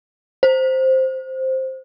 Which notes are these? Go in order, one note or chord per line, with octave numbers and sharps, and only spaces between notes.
C5